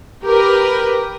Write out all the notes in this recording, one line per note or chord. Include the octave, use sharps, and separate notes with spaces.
G4 A#4 B4